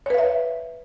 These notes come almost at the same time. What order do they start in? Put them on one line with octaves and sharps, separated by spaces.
C#5 B4 F5 E5